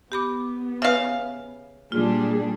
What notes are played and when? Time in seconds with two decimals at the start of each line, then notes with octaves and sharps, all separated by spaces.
0.12 B3 G4 B5 D6
0.82 C#3 B4 E5 F5
1.92 A#2 G3 D4 F4 G#4